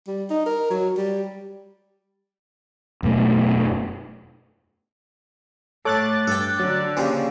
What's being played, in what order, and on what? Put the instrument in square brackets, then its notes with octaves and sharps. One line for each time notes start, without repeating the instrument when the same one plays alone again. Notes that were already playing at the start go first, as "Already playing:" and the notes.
[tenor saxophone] G3
D#4
A#4
F#3
G3
[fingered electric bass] E1 F#2 B2 A3
[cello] A2 A3 [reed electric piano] A4 C#5 [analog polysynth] D6 F#6 A6
[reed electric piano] G2 [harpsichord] A4 G5
[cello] D3 [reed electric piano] F#3
[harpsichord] A#2 C#3 F3 [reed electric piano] C#4 G4 G#4